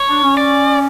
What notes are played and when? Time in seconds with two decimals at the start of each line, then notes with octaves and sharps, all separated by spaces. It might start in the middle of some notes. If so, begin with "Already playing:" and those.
Already playing: C#5
0.08 D4
0.23 C#4
0.37 D5